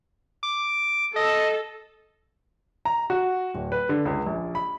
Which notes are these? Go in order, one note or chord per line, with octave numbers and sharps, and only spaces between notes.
D6
A4 D#5
A#5
F#4
D1
B4
D3
C#2
A#1
B5